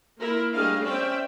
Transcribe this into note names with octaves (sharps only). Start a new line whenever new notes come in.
A#3 E4 F4 A#4
G3 A3 D4 G#4 D#5 F5
C4 C#4 D5 E5 G5